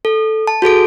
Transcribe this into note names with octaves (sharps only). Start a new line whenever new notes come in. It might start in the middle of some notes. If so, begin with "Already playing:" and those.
A4
A5
F#4 G#4 A4 D7